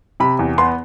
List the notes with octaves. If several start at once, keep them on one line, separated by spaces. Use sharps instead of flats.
C3 B5
E2
B3 C6